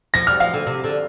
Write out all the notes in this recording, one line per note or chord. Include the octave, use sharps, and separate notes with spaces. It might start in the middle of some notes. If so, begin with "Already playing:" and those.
F3 A#6
G3 F6
F3 F5
D3
C3
D3